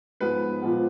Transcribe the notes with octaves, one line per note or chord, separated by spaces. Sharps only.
G#2 F3 G#3 B3 B4
A#2 F3 G#3 B3